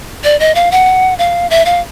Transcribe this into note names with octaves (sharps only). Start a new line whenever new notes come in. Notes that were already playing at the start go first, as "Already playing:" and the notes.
D5
D#5
F5
F#5
F5
E5
F5